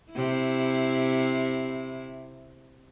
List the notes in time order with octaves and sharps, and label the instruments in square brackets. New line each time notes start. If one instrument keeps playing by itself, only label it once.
[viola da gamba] C3 E4